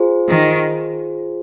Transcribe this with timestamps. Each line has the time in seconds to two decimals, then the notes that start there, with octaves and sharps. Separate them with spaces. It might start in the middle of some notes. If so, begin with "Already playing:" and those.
Already playing: F4 G#4 C5
0.28 D#3